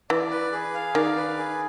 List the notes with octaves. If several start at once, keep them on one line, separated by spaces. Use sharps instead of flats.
E3 D5
B4
G#4
F5
D#3 D5
B4
G#4